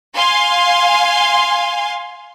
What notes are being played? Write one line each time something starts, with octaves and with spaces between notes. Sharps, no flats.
F5 G#5 C6